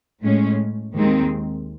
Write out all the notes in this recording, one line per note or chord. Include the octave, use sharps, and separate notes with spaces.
A2 G#3 C#4
D#2 D#3 G#3 C4